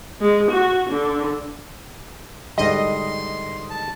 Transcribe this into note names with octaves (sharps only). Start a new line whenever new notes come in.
G#3
F#4
D3
G#2 D3 G3 D#5 C6
A5